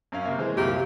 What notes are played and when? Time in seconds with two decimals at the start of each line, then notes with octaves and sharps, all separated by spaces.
0.12 F#2 C#4 F5
0.25 C3 A#3
0.39 E3 G#3 C5
0.57 C2 F#2 A#2 G4